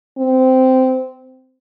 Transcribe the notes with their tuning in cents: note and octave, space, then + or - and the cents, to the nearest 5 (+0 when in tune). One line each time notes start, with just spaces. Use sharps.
C4 -15